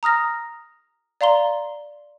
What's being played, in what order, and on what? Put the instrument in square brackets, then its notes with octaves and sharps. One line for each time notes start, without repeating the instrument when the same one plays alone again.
[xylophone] A#5 D#6 F6 A#6
D5 F5 A#5 C6 G7